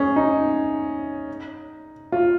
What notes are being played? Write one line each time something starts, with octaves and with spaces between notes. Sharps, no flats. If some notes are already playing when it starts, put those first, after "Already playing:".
Already playing: C#4 G#4
D#4
F4